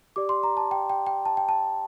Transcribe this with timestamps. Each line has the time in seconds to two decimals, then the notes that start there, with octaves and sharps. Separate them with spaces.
0.16 G4 D5 D6
0.29 C6
0.43 A#5
0.57 A5
0.71 G5
0.90 G5
1.07 G5
1.25 A5
1.37 G5
1.49 A5